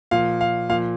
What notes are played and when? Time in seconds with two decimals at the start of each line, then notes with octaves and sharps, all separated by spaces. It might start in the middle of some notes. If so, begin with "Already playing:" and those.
0.11 A#2 F3 F5
0.41 F5
0.69 A#2 F3 F5